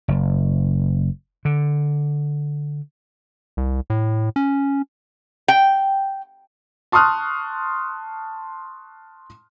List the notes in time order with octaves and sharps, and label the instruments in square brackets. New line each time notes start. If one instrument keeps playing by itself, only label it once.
[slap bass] F#1
D3
[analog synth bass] C2
A2
C#4
[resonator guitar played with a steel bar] G5
[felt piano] A5 C6 C#6 D#6 F6 F#6